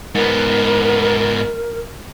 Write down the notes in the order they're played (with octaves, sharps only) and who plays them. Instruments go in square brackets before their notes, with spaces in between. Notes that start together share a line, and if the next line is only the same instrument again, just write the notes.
[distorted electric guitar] G#2 B3 [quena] A#4